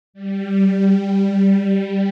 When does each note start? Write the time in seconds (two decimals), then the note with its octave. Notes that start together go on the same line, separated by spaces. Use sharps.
0.14 G3
1.03 G3